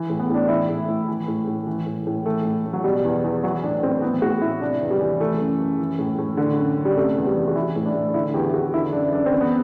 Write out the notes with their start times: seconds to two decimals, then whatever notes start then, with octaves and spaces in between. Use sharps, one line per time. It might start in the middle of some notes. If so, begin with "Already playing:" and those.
Already playing: E3
0.10 A2
0.20 B3
0.30 A2 D4
0.49 E3 E4
0.69 A2
0.89 A2
1.08 E3
1.28 A2
1.47 A2
1.67 E3
1.86 A2
2.07 A2
2.25 E3 A3
2.45 A2
2.66 A2
2.73 F#3
2.84 B2 G3
3.04 E2
3.24 E2
3.43 E3 F#3
3.63 A2 D4
3.83 A2 C4
4.02 E3 B3
4.22 A2 F#4
4.42 A2 E4
4.61 C3 D4
4.81 E2
4.91 G3
5.01 E3
5.20 E3 A3
5.40 F#2
5.60 F#2
5.79 E3
5.99 A2
6.18 A2
6.37 D3
6.58 F#2
6.77 F#2
6.85 G3
6.96 C3 A3
7.17 E2
7.27 G3
7.36 E3
7.48 F#4
7.56 E3 E4
7.76 A2
7.85 D4
7.94 A2
8.14 D3 E4
8.34 E2 G4
8.53 E2 F#4
8.74 D3 E4
8.93 F#2 D4
9.12 F#2 D4
9.26 C4
9.33 E3
9.41 B3